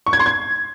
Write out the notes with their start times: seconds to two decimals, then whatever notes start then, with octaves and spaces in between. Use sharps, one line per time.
0.06 C#6
0.13 G#6
0.19 C6
0.26 G#6